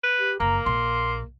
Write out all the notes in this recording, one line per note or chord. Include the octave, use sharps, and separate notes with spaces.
B4
G4
F#1 A#3 A#5
A#1 C6